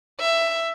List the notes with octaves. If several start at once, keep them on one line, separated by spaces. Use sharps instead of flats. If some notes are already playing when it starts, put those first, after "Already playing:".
E5